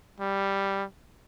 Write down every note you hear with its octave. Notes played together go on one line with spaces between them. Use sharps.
G3